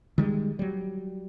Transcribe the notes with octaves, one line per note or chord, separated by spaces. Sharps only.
D#3 G3 G#3
F#3 G3